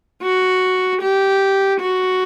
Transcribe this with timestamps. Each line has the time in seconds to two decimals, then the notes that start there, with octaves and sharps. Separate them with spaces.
0.22 F#4
1.02 G4
1.80 F#4